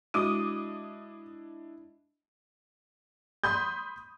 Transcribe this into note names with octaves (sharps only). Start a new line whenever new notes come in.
G#3 D4 E4 F#4 D#5 D6 D#6
B5 C6 D#6 G6